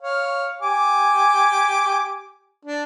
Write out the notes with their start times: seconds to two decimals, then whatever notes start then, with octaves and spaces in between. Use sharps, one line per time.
0.02 C#5 F5
0.62 G4 G#5 D6
2.65 D4